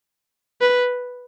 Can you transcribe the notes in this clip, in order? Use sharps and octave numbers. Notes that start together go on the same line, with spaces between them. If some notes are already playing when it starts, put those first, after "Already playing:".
B4